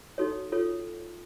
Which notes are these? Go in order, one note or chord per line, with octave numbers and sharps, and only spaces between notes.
D#4 F#4 A4 C#5
F4 A4 C#5